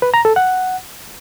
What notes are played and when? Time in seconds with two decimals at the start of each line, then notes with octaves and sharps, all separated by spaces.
0.02 B4
0.14 A#5
0.25 A4
0.36 F#5